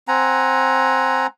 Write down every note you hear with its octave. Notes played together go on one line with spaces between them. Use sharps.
C4 F#5 G#5 A#5